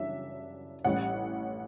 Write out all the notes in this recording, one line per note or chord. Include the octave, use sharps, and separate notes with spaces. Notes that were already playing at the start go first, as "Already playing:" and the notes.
Already playing: F#2 C#3 E3 G3 D4 E5
A1 A2 G3 C#4 F#5